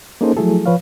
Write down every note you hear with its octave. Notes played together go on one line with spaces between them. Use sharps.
A#3 C#4 D#4 G#4 A4 C5
F3 F#3 A3 E4 G#4 A4
F3 B4 C#5 F5